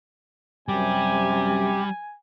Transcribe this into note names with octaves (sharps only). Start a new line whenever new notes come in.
F#2 C3 G3 G4 G#5